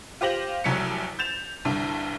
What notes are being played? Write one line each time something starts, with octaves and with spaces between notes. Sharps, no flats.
F4 G4 C5 A#6 F#7
F1 C2 F#3 B6 C#7
G6 A6 E7 F7
C2 G2 D3